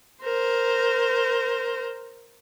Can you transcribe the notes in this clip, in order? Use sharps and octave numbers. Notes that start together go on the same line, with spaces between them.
A#4 C5